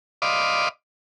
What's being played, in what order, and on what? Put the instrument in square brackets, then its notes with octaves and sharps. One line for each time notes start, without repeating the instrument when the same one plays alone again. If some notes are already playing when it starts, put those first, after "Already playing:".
[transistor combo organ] D5 D#5 F5 B5 C6 D6